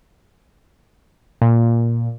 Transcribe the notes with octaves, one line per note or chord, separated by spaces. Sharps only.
A#2